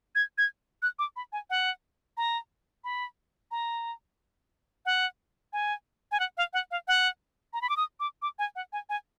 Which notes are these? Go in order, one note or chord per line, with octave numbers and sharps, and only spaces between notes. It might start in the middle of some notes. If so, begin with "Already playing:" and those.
G#6
G#6
F#6
D6
B5
G#5
F#5
A#5
B5
A#5
F#5
G#5
G#5
F#5
F5
F#5
F5
F#5
A#5
B5
D6
D#6
D6
D6
G#5
F#5
G#5
G#5